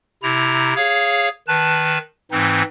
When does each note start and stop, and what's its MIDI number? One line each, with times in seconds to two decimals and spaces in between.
0.23 0.74 48
0.23 0.74 64
0.23 0.74 82
0.76 1.29 68
0.76 1.29 73
0.76 1.29 77
1.48 1.98 51
1.48 1.98 71
1.48 1.98 81
1.48 1.98 90
2.31 2.63 44
2.31 2.63 52
2.31 2.63 60
2.31 2.63 63